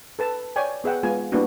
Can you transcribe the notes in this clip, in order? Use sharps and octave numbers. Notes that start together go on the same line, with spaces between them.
A4 B4 A5
C#5 D5 G5 G#5
B3 G#4 E5 F#5 G5
G#3 B3 F4 G#5
G3 A#3 B3 D4 E4 F#4